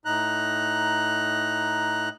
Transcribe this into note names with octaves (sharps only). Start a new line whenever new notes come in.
A2 D#4 A#5 F#6